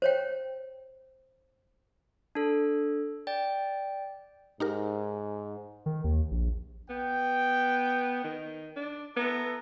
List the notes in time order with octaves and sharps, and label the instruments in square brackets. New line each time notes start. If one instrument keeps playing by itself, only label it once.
[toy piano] C5 C#5 G5
[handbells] D4 A4
D5 G5
[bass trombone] G#2 [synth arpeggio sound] D#4 G4 A#4
[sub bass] D#3
D#2
A#1
[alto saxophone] B3 [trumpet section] G5
[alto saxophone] D#3
D4
[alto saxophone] B3 [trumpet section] E4 A4 A#5